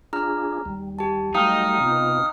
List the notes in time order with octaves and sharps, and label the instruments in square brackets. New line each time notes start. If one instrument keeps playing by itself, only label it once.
[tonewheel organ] D4 F4 G#4 [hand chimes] A#5 F6
[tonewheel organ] D#2 G3
[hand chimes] G4 A5
[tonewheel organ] F#3 G3 A3 [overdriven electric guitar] D#4 [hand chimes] F5 G5 [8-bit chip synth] D#6 F6
[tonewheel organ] C3 B3 F4